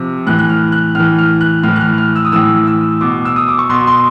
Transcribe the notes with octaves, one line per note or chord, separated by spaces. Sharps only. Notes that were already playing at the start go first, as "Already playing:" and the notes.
Already playing: C3 F3
A2 E3 F#6
F#6
F6
F#6
A2 E3 F6
F6
F#6
A2 E3 F6
F#6
F6
F6
E6
D#6
A2 E3 E6
E6
B2 D6
E6
D#6
D6
C#6
B2 C6
C6